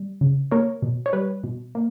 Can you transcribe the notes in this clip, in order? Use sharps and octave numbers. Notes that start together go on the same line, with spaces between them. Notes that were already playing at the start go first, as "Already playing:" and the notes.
Already playing: G3
C#3
A#3 A#4 C#5
B2
C#5
G3 B4
B2
A#3